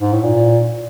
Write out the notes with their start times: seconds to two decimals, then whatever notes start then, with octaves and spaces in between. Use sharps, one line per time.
0.01 G#2
0.13 A2
0.23 A#2